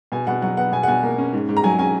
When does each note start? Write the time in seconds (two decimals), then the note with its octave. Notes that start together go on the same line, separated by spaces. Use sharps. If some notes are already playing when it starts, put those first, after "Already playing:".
0.12 B2 G#5
0.27 B2 F#5
0.42 F#3 F#5
0.57 B3 F#5
0.72 B2 G#5
0.83 F#5
0.88 B2 G#5
1.03 A#3
1.18 C#4
1.33 G#2
1.49 G#2
1.57 A#5
1.64 F#3 G#5
1.79 C#4 G#5